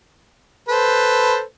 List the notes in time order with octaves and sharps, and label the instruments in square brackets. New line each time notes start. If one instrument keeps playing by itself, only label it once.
[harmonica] A4 B4 C5